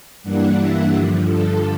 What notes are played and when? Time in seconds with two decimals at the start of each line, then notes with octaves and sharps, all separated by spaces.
0.23 G2 E3 G3 A#3 D4 F#5
0.58 E5
0.91 G2 D3 F3
1.26 A4